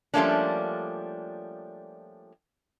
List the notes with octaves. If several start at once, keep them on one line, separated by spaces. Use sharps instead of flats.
F3 G3 A3 A#3 C#4 D4